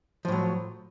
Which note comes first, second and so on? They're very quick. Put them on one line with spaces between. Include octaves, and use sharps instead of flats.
F3 A2 F#3